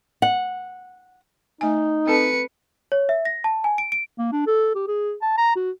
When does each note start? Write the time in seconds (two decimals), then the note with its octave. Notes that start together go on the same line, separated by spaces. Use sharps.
0.22 F#5
1.61 A3 D#4 G#5
2.07 C4 A4 B4 A5 C#7
2.92 C#5
3.09 E5
3.25 A#6
3.44 A5
3.64 G#5
3.78 D7
3.92 D7
4.18 A#3
4.32 D4
4.46 A4
4.75 G4
4.88 G#4
5.22 A5
5.38 A#5
5.56 F#4